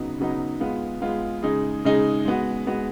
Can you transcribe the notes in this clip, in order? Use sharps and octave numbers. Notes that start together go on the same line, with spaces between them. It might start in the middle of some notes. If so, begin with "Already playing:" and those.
Already playing: C#3 F#3 B3 D#4
C#3 F#3 B3 D#4
G#3 B3 F4
G#3 B3 F4
C#3 G#3 D#4 G#4
C#3 G#3 D#4 G#4
G#3 B3 F#4
G#3 B3 F#4